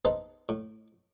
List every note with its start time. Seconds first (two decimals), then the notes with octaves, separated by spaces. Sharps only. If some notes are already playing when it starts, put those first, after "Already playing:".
0.05 B3 D#4 A4 B4 C5
0.49 A2